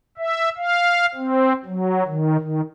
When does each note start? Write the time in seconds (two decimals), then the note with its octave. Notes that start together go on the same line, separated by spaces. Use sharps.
0.18 E5
0.57 F5
1.14 C4
1.66 F#3
2.06 D#3
2.40 D#3